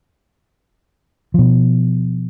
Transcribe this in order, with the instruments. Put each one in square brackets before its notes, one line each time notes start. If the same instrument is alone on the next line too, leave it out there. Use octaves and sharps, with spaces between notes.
[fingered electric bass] B2 F3